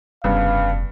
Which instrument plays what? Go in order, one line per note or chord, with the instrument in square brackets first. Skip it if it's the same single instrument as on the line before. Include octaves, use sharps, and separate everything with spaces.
[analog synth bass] F1 [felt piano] G2 C#3 B3 [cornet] F5